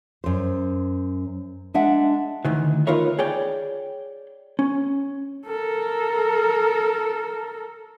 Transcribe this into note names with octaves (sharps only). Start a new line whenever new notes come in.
F#2 C5
G#3 D4 E5 F#5
D2 D#3 E3
D#4 F4 A#4 B4 C#5 E5
G#4 C#5 D5 G5
C#4
A4 A#4